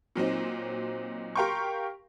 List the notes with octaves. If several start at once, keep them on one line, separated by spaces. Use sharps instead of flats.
A#2 F#3 C4 D#4
G4 A#4 F5 G5 C6 C#6